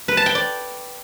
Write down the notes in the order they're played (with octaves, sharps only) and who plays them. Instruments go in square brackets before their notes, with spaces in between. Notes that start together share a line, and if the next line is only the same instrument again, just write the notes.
[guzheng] B4
A5
G5
D5